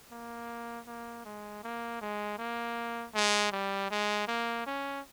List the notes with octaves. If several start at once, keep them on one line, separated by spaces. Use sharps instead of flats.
A#3
A#3
G#3
A#3
G#3
A#3
G#3
G3
G#3
A#3
C#4